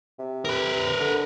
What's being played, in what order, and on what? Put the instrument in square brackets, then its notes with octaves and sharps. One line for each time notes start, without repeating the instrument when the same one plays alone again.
[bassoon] C3
[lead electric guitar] A#4 B4
[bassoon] D3